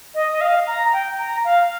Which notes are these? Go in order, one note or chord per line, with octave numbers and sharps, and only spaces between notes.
D#5
D#5
F5
A#5
G5
A#5
F5